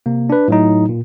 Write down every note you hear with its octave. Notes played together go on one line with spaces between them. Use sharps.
C3 A#3
D4 B4
A2 F#3 D#4
A#2